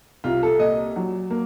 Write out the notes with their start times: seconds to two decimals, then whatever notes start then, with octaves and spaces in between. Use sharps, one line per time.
0.24 C2 F4
0.43 A4
0.59 A#2 D#5
0.96 F#3
1.31 A#3